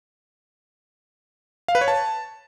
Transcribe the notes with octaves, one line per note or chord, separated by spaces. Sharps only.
F5
B4
C#5
A5